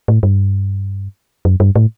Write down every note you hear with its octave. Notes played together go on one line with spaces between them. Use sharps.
A2
G2
F#2
G2
A2